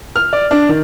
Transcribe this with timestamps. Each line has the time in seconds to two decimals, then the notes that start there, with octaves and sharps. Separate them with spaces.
0.16 F6
0.33 D5
0.51 D4
0.69 D#3